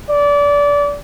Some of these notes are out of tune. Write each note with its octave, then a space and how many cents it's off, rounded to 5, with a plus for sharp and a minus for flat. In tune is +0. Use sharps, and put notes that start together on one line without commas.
D5 -25